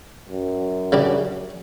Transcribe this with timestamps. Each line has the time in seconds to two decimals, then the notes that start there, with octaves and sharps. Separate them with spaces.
0.29 F#2
0.92 C#3 G3 D4